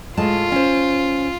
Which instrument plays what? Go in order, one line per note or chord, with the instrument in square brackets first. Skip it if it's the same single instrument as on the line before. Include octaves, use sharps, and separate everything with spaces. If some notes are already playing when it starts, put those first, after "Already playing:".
[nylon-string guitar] A2 G#3 A5 [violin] F4
[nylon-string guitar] C#4 C5